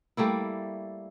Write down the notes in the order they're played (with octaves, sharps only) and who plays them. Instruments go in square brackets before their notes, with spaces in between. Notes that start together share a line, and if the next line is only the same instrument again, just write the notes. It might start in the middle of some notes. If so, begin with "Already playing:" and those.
[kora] G3 A3 A#3 E4